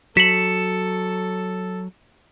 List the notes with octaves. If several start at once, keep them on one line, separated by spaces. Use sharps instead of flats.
F#3 A4 B6 C#7 E7 F#7